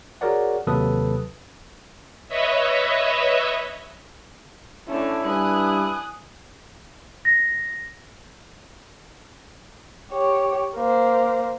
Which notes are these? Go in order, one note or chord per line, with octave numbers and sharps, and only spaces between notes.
F#4 G#4 A#4 C#5 D5 F#5
D#2 C3 F#3 A4 B4 D#6
B4 C#5 D#5 E5
D3 A3 C#4 D4 E4
G2 G#5 D#6 F#6
A#6
G4 C#5
A#3 C5